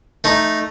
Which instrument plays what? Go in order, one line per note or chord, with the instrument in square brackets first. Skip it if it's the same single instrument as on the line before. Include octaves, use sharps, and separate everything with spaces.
[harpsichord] A3 D#4